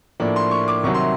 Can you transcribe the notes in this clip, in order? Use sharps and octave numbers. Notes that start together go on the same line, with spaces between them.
A2 F3 A#3 D4
C6
C#6
D6
C2 C3 D#3 F#3 C#6
C6